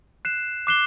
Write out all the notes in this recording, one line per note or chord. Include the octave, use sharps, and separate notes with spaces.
F#6 C7 E7
D6 F#6 C7 E7 G7